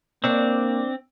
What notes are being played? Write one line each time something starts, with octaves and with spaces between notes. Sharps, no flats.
A#3 C4 D4 C#5